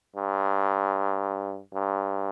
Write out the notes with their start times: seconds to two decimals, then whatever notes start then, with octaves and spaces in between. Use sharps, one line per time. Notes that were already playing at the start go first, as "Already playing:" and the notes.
0.16 G2
1.75 G2